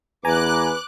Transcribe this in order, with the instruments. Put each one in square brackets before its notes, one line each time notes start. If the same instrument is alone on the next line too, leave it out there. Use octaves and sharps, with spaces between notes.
[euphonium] E2 [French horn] B4 [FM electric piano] G#5 A#5 [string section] D6 F#6